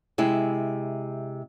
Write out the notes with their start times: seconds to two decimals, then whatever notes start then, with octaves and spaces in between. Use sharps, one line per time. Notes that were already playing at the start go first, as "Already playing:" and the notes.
0.18 C3 G#3 E4